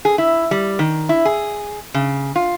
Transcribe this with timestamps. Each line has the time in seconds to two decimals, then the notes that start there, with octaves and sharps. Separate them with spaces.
0.05 G#4
0.18 E4
0.51 G3
0.79 D#3
1.09 E4
1.25 G#4
1.94 C#3
2.36 F4